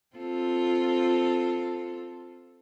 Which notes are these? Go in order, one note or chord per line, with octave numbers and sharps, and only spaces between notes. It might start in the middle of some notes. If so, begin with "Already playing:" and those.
C4 F4 A4